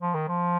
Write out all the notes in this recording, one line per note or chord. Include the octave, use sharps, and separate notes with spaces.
F3
D#3
F3